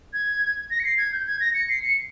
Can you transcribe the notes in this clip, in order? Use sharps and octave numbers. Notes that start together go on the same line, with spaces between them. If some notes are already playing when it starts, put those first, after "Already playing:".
G#6
A#6
C#7
C7
G#6
G6
G#6
A#6
C#7
C7
C#7